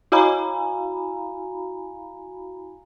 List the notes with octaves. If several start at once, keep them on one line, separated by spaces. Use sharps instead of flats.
E4 F#4 F5 G#5 A#5 B5